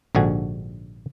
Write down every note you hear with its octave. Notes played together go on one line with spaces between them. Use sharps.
A#1 G#2 D3 F#4 G#5